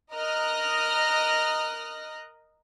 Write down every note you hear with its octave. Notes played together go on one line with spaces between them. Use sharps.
A#4 D#5 D#6 F6 F#6 A#6